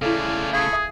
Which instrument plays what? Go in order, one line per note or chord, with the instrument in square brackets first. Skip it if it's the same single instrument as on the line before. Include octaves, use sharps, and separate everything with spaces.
[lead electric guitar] C#3 A3 [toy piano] E4 A4 [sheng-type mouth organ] D5 F5 G#5
[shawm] G#4 [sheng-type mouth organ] A4 B5 C#6 [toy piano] F5
[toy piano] E5 D#6